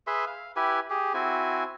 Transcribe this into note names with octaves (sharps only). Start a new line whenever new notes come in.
G#4 B4 E5 C6
F5
E4 G4 B4 G#5
G4 G#4
C4 E4 F#4 G#5